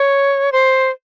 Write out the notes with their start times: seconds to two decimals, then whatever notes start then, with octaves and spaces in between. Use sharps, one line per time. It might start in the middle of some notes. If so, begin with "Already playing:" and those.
Already playing: C#5
0.52 C5